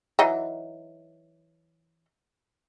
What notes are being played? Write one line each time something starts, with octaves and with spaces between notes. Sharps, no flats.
E3 F#3 D#4